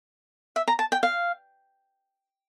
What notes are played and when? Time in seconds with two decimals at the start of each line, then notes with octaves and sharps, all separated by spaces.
0.56 E5
0.68 A#5
0.79 A5
0.92 G5
1.03 F5